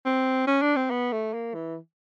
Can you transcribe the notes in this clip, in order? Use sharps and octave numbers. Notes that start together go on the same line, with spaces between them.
C4
C#4
D4
C4
B3
A3
A#3
E3